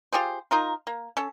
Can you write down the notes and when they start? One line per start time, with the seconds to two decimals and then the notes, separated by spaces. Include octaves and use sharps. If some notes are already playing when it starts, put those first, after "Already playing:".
0.13 F4 G4 G#4 C5
0.51 D#4 F4 A#4
0.87 A#3
1.17 C#4 A4